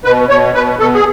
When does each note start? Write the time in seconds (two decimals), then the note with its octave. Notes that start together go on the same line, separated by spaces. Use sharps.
0.04 B2 B4
0.29 B2 C#5
0.55 B2 B4
0.79 B2 A4
0.94 G#4